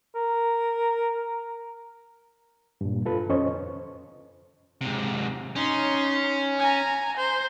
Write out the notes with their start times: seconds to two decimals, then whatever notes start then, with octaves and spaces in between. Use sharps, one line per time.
0.15 A#4
2.81 G2 A#2
3.05 F4 A4 B4
3.29 F2 C#4 C5 D#5 C#6
4.81 G#2 C3
5.56 C#4 D#4 C6
6.59 G#5 A#5
7.17 C5